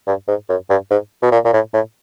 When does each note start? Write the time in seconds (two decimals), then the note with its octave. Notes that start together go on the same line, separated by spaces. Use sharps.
0.07 G2
0.28 G#2
0.49 F#2
0.70 G2
0.90 G#2
1.23 B2
1.32 A#2
1.45 A#2
1.53 A2
1.74 A2